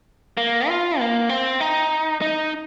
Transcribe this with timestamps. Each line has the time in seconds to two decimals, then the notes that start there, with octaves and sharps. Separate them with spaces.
0.37 A#3
0.68 F4
0.99 A#3
1.29 C4
1.60 D#4
2.21 D#4